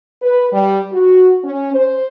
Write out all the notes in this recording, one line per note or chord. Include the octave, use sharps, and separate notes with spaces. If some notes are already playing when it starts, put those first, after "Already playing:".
B4
G3
F#4
C#4
C5